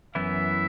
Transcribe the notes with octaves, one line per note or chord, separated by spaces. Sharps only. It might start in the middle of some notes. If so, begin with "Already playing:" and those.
F#2 E3 B3 E4 E5